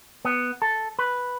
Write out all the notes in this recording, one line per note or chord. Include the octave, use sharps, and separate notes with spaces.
B3
A4
B4